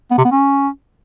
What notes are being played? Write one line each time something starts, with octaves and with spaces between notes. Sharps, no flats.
B3
C3
B3
C#4